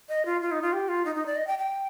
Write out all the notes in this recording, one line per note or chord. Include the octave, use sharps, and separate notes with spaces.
D#5
F4
F4
D#4
F4
G4
F4
D#4
D#4
D5
D#5
G5
G5